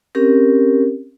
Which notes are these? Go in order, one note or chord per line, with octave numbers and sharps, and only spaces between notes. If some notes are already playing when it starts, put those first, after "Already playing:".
C4 C#4 G4 A#4